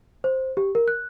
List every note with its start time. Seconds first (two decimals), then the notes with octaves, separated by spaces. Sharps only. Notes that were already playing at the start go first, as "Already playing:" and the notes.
0.24 C5
0.57 G4
0.75 A#4
0.88 F#6